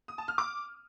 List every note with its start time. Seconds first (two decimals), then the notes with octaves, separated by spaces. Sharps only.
0.08 D#6
0.18 A5
0.28 F6
0.38 D6